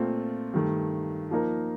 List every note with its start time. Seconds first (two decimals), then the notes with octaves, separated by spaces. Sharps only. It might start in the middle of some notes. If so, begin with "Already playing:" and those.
Already playing: A#2 A3 C4 F4
0.53 G2 D#3 A3
1.31 F3 A#3 D#4 A#4